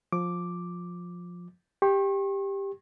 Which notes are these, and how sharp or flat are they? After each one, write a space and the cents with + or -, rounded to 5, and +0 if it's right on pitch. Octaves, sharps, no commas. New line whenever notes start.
F3 +15 D6 +0
G4 +10 C#6 -45